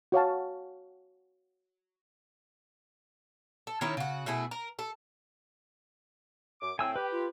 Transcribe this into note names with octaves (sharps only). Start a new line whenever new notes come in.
F#4 C#5 F5 A5
A4
D#3 C#4 E4 C#5
C#3 F#4
B2 A3 E4 G#4
A#4
A4
F#2 D6
A2 A3 C4 G5 G#5 E6
G4 B4
F4